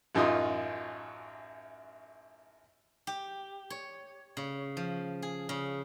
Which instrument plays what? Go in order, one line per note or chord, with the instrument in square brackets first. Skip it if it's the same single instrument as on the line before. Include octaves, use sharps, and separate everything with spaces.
[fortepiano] A1 F#2 D#4 F4 D#6
[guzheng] G4
C#5
C#3
F3
G#4
C#3